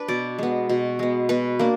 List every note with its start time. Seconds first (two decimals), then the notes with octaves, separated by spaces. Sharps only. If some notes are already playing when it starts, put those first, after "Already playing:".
Already playing: D4 B4
0.08 B2 D5
0.38 G#3 B3
0.69 B2
0.99 G#3 B3
1.29 B2 B4
1.59 A#3 D4